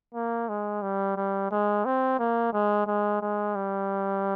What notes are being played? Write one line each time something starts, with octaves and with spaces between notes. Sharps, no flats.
A#3
G#3
G3
G3
G#3
C4
A#3
G#3
G#3
G#3
G3